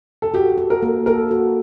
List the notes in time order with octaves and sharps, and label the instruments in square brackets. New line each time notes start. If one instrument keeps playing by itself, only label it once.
[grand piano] A4
[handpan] F#4 [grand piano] G4
[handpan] A4
[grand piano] A#4
[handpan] A#3
[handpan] A4 [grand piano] A#4
[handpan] F#4